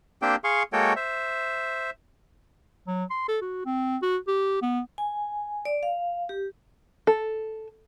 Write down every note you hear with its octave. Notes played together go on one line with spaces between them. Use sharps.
A#3 C4 D4 G4 C5 G5
G#4 F5 C6 C#6
G#3 A#3 F#4 A4 C#5 G5
C5 E5
F#3
C6
A4
F#4
C4
F#4
G4
B3
G#5
D5
F5
G4
A4